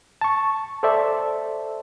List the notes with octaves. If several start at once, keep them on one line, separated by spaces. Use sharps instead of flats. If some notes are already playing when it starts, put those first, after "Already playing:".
A5 C#6
A4 C5 D5 E5 A5